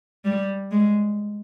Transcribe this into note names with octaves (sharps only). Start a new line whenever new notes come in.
G3
G#3